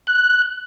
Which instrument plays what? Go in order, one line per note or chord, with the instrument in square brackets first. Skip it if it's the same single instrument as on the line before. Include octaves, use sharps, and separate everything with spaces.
[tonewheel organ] F#6